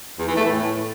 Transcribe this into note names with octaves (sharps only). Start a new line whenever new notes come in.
E2
E3
A3
A2